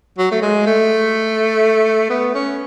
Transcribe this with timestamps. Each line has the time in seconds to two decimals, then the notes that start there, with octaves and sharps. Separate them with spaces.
0.18 F#3
0.31 A3
0.42 G#3
0.66 A3
2.10 B3
2.34 C#4